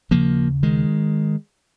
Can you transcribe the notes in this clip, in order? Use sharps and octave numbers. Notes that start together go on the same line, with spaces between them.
D#2 C#3 F3 A#3
D#3 G#3